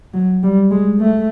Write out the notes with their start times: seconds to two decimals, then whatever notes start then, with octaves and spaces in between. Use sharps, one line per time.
0.14 F#3
0.43 G3
0.71 G#3
1.00 A3